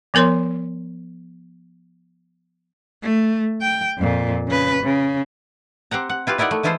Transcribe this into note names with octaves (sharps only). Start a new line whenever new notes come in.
F3 B3 A#4 C#5 C6
A3
G5
F2 A#2
C#3 B4
C#3
C4 G4 F#5 A#5
F#5
E4 F4 G4 B4
D#4 E4 A#4 D5 F#5
A3
E3 G#3 E4 F4 A4 C5